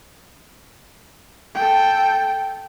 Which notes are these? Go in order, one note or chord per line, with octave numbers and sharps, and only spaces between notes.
A4 G5